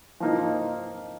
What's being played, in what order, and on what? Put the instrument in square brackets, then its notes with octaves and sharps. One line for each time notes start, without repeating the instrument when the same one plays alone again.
[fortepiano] F3 A#3 D#4